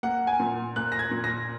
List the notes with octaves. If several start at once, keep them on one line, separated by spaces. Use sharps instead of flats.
A#3 F#5
G#5
A#2
A#3 F#6
A#6
G#6
A#2
A#6